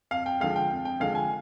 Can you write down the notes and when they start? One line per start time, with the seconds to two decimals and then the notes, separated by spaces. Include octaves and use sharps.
0.11 F2 F5
0.26 G5
0.40 D3 F3 G#3 F5
0.56 G5
0.71 F2
0.85 G5
1.00 D3 F3 G#3 F5
1.15 G#5